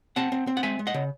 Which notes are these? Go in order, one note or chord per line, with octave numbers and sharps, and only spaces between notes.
C4 F#5 A5
C4
C4
F#5
G#3 E5 G#5
G#3
D#5 F#5
C#3